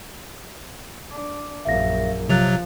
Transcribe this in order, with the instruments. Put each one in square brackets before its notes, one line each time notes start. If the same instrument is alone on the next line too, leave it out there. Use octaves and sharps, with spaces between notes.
[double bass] D4
[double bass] A#1 F#2 [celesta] E5 F5 A#6
[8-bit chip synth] C3 F#3 [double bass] F3 [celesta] F#6 A6 F7